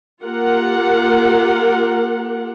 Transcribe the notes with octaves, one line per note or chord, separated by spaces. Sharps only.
A#3 F4 G4 A#4 F#5